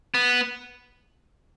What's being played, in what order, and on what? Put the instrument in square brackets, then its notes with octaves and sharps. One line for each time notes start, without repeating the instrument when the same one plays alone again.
[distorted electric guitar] B3